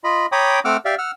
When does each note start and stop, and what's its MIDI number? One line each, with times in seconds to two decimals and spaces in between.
0.04 0.26 65
0.04 0.26 75
0.04 0.26 83
0.32 0.60 73
0.32 0.60 79
0.32 0.60 82
0.32 0.60 83
0.32 0.60 86
0.32 0.60 87
0.65 0.77 57
0.65 0.77 60
0.65 0.77 78
0.65 0.77 86
0.65 0.77 88
0.65 0.77 89
0.85 0.95 67
0.85 0.95 74
0.85 0.95 76
0.85 0.95 77
0.98 1.11 78
0.98 1.11 88
0.98 1.11 89